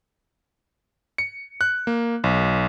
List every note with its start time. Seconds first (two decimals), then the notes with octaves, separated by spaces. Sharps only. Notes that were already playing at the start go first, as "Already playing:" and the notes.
1.18 C#7
1.61 F#6
1.87 A#3
2.24 B1